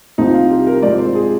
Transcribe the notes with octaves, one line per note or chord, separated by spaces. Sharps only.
C2 C3 F3 D#4
F4
G4
A#4
G#2 F3 G#3 C4 D5
C5
G#4